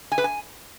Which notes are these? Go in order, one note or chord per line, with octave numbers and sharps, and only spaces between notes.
G#5
B4
G#5